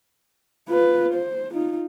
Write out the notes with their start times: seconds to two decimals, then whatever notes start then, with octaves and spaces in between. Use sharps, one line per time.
0.68 F4 B4
1.14 C5
1.53 D#4 F4